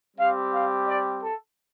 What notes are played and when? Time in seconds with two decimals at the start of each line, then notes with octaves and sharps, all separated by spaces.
0.17 G3 C4 G4 F5
0.53 F5
0.87 D5
1.23 A4